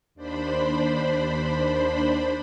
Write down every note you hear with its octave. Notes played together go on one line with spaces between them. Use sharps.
D#2 D4 C5 B5